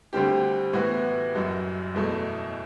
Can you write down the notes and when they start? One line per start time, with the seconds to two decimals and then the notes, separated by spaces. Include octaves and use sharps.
0.13 D2 D3 G3 C4 G4
0.73 A2 E3 B3 F#4
1.35 F#1 F#2 F#3
1.95 F#1 E2 B2 F#3 A3